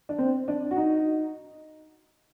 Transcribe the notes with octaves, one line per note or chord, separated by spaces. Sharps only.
D4
C4
D4
F#4
D#4